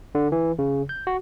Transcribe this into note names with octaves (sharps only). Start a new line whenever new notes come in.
D3
E3
C#3
G6
F#4